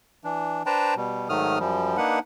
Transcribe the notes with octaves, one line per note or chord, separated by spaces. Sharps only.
E3 D4
D4 B4 C5 G5 A5 A#5
B2 G3
G#2 D#3 F#3 A3 D#6 F6
F#2 F3 G3
A#3 D4 D#4 B4 F#5